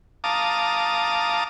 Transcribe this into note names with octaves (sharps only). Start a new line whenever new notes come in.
F5 A5 A#5 D6 D#6